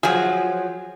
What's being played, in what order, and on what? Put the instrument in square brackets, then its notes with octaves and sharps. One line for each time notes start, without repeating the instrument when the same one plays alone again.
[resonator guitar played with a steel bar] F3 F#3 [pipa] G#4